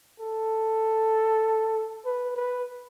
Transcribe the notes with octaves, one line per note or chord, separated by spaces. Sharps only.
A4
B4
B4